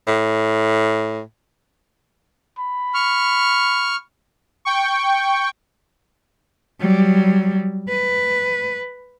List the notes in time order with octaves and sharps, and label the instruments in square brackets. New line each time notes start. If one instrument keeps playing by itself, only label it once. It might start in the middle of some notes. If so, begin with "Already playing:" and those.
[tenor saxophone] A2
[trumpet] B5
[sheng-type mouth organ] C#6 F6
[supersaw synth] G5 C#6
[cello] F#3 G3
B4